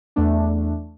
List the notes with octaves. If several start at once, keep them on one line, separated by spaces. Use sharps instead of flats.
E2 A3 D4